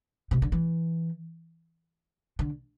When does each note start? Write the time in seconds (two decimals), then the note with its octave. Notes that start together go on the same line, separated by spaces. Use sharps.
0.31 C3
0.42 D3
0.52 E3
2.39 D3